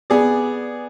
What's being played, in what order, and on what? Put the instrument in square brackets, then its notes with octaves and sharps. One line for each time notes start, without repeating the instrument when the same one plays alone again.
[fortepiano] B3 G#4 D5